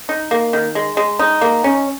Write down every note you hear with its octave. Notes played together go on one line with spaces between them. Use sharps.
D#4
A#3
D#3
G#3
G#3
D#4
A#3
C#4